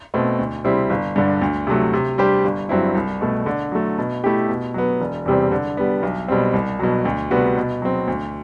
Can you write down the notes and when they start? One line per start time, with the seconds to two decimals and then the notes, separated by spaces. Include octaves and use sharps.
0.14 B2 A3 C4
0.39 D2
0.64 C3 G3 C4 E4
0.90 G1
1.16 G2 D3
1.42 D2
1.67 C3 F#3 A3
1.93 C3
2.18 G3 D4 G4 C5
2.44 G1
2.69 G2 F#3 C4 E4
2.95 C2
3.21 B2 A3
3.46 D3
3.72 F#3 A3
3.98 B2
4.24 A3 E4 G4
4.49 B2
4.74 F#3 B3
5.01 E1
5.26 E2 C3 G3 C4
5.51 D3
5.77 G3 B3
6.03 B1
6.28 B2 G3 C4
6.54 C2
6.79 B2 F#3
7.05 D2
7.31 C3 G3 B3 F#4
7.57 B2
7.82 F#3 C4
8.08 D2